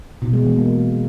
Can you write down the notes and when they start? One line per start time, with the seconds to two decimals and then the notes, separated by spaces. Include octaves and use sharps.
0.22 B2
0.33 G#3
0.45 E3
0.56 A#3